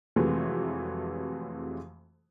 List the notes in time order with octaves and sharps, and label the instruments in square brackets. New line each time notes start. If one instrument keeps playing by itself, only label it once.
[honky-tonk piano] F2 C3 E3 F#3 G#3 A3